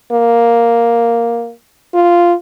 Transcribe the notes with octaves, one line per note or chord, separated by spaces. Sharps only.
A#3
F4